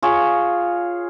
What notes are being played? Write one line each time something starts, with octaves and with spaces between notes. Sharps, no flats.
F4 G#4 C#5